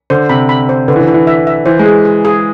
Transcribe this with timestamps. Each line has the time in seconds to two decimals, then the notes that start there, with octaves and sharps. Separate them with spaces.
0.10 D3 C5
0.29 C3 B5
0.49 B5
0.69 C5
0.88 D3 B4
0.96 E3
1.01 D3
1.08 E4
1.14 E3
1.27 E5
1.47 E5
1.66 E3 C5
1.79 G#3
1.86 G#4
2.05 G#4
2.25 G#4